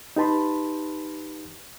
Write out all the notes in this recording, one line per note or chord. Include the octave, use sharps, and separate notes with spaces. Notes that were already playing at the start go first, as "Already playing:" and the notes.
D#4 G4 B4 A5 B5 C6